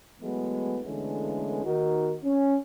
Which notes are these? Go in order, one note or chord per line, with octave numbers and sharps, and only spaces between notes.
E3 F#3 G#3 A3 B3
D3 E3 G#3 A3 B3 C#4
D#2 D#3 D#4 F#4 A#4
C#4